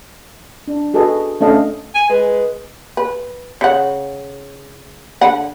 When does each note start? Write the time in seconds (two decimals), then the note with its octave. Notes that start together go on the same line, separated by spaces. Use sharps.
0.68 D4
0.94 F#4 G#4 A4 B4 D#5
1.41 A3 C#4 D4 A4 D#5 F5
1.95 G#5
2.09 G#3 B4
2.97 B4
3.61 C#3 F#5
5.21 D3 F#5 B5